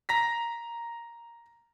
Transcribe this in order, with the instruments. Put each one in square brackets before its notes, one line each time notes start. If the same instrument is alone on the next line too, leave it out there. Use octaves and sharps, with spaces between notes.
[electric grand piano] A#5 A#6 B6